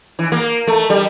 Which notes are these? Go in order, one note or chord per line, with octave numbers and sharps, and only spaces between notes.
E3
A#3
A3
G3